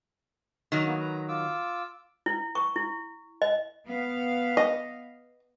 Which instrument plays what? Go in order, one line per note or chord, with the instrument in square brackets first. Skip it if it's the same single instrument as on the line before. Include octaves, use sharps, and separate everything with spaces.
[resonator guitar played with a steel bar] D#3 F#3
[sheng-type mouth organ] A#3 B3
B4 A#5
F4 D6 E6
[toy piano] E4
C#6
E4
D#5
[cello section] B3 F5
[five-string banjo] D#5